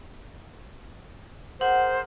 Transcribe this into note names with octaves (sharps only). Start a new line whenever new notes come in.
G#4 A#4 C5 F#5